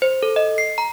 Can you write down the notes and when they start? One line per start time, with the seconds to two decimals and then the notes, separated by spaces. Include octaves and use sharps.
0.02 C5
0.23 A4
0.36 D#5
0.58 C7
0.78 A#5